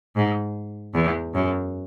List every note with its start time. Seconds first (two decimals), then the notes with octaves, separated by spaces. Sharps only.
0.16 G#2
0.95 E2
1.35 F#2